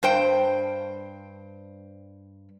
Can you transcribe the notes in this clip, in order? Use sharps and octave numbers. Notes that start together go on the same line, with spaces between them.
G2 C5 G5